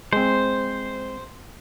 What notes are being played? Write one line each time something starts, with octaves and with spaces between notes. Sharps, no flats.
G#3 C4 C5